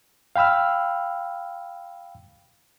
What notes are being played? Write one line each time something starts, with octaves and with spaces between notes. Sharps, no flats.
F5 G5 B5 E6 F6